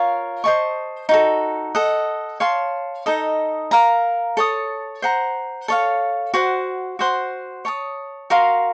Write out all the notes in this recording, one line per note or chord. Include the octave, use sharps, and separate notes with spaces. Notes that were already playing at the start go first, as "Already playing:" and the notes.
Already playing: F4 A#4 C#5 F5
C5 D#5 A5 C#6
D#4 F#4 A4
A4 D#5 F#5
C#5 F5 A5 C6
D#4 A4 D#5
A#4 F5 A#5
A4 C#5 A5 D#6
C5 F#5 A#5
A4 C#5 F5
F#4 C5 F#5
F#4 C5 F#5 C6
C#5 A5 D#6
F#4 A#4 F5 C6